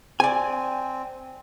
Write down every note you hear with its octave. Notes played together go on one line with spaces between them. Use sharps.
C4 D5 G#5